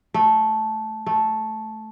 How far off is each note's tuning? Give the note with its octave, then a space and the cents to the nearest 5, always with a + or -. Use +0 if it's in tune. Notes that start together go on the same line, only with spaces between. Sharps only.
A3 -10
A3 -10